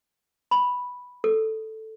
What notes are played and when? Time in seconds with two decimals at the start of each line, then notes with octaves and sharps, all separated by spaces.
0.51 B5
1.24 A4